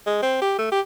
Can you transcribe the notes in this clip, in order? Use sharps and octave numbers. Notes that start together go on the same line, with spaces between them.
G#3
C4
G4
A3
G4